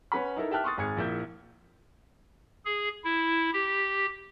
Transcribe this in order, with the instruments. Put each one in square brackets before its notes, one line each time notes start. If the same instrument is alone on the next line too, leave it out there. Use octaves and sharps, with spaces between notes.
[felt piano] C#4 B4 F#5 B5
D#4 E4 A4 A#4
G4 E5 G5 A5 F6 F#6
C6 C#6 D#6 A6
G#1 G#4 G#6 C#7
A#1 A#3 E4 E5 G6
[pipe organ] G#4
E4
G4